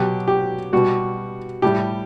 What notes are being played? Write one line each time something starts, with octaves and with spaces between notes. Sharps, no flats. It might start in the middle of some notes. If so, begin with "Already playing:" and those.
Already playing: B2 F#3 G4
G4
B2 G3 F#4
A2 G3 G4